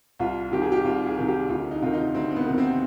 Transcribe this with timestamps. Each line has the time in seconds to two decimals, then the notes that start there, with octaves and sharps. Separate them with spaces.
0.19 C2 F4
0.52 C3 D#3 G4
0.62 G#4
0.72 G4
0.84 C2 F4
1.06 G#4
1.18 C3 D#3
1.28 G4
1.49 D2 F4
1.71 D#4
1.82 C3 D#3 F4
1.93 D#4
2.15 D2 C4
2.31 C4
2.36 B3
2.47 C3 D#3
2.58 C4